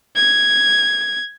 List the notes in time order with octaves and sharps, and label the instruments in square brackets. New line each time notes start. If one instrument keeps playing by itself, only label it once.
[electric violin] G#6